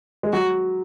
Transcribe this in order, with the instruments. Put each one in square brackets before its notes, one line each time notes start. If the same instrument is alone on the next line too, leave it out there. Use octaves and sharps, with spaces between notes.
[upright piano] G#3
[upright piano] F#3 [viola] F#4